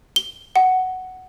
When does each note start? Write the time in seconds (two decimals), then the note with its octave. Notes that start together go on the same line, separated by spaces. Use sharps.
0.16 G7
0.56 F#5